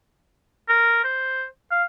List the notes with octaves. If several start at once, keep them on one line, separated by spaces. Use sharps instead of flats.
A#4
C5
F5